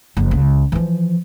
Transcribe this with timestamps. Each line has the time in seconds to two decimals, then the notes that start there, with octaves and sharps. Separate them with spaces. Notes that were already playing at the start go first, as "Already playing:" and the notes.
0.17 F#1 F2
0.31 C#2
0.72 E3 F3